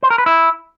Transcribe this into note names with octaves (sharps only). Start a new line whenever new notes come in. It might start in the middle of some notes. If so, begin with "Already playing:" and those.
C5
A#4
B4
E4